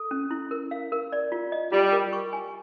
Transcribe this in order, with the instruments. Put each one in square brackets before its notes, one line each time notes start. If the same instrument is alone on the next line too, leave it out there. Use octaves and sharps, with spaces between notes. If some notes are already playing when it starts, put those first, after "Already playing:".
Already playing: [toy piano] A4
C#4
E4
A#4
F5
A#4
D5
F4
D#5
[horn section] G3 [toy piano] F4
[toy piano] A#4
C#6
G#5